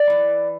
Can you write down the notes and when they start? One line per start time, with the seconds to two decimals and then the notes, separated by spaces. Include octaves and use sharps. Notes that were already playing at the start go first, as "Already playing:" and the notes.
Already playing: D5
0.10 E3